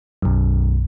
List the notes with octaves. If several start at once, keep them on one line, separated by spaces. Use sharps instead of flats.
B1 F#2